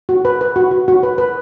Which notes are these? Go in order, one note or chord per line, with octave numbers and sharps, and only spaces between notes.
F#4
B4
B4
F#4
F#4
F#4
B4
B4